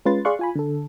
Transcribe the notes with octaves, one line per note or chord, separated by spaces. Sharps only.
G#3 C#4 F4 B4 C6 A6
G#4 D5 F5 C6 C#6 F#6
F4 G#5 B5
D3 A4